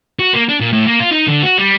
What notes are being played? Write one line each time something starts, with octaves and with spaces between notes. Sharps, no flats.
F#4
A#3
D4
A#2
A2
A#3
F4
D#4
D3
F#4
G3